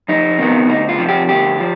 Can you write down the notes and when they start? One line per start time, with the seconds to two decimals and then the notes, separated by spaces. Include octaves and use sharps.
0.08 F2 D#4
0.38 C3 D#3 B3
0.69 D2 D#4
0.89 F4
0.99 C3 F3
1.09 G4
1.29 D2 G4
1.59 F3